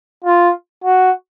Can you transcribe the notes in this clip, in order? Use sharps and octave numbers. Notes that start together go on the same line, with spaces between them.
F4
F#4